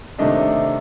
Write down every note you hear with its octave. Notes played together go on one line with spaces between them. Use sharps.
C3 D#3 A3 D4 D#5